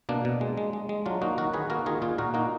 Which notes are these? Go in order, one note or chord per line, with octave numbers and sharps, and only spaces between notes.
B2 A#3 D4
B2
G#3
G#3
G#3
G#3
F#3 D4 F4
A#3 D#4 F#4
D#3 F#4 A#4
D#3 G#4 B4
A#3 F#4 A#4
D#3 F4 G#4
A#2 F4 G#4
A#2 F#4 A#4
A#3 D#4 F#4